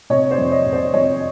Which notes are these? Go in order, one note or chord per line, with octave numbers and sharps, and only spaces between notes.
C3 C#5 D#5
C5 D5
F2
C#5 D#5
C3
C5 D5
F2 C#5 D#5